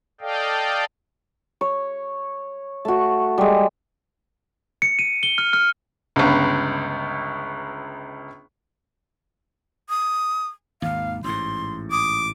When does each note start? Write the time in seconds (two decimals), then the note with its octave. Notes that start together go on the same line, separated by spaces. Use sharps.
0.21 A4 D5 D#5 F5 G5
1.61 C#5
2.85 A3 F#4
3.38 G3 G#3
4.82 C#7
4.99 D#7
5.23 G7
5.38 F6
5.53 F6
6.16 G1 C#2
9.89 D#6
10.82 G#1 D#2 F5
11.24 A1 G#2 C6
11.91 D6 D#6